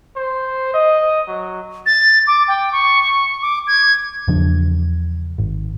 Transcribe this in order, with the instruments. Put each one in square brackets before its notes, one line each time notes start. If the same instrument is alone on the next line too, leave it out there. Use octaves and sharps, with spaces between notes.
[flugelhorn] C5
D#5
F#3
[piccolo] A6
D6
G5
C#6
D6
G#6
[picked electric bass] E2 C#3 F3 D4
G#1